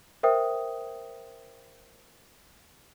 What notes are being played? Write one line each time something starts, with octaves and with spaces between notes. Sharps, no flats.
A#4 C5 E5 G5 D#6